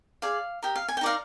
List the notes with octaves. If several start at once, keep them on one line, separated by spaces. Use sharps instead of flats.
G#4 D5 F5
G4 A#4 D#5
F5
G#5
G5
D#4 A#4 D5 F5